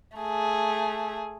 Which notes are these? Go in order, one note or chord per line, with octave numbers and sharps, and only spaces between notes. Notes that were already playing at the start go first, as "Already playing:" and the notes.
A3 G#4